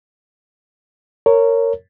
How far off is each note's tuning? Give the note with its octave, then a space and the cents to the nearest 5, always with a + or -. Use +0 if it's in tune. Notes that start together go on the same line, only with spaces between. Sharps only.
A#4 -20 C#5 +0